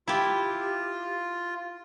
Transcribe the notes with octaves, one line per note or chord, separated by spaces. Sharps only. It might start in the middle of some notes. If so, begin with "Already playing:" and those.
E4 F4 G4